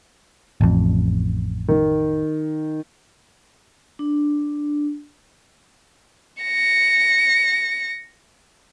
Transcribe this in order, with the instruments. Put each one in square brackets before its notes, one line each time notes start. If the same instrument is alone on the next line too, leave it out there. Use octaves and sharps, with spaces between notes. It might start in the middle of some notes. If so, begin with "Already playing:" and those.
[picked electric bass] A1 F2
[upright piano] D#3
[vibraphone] D4
[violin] A#6 C#7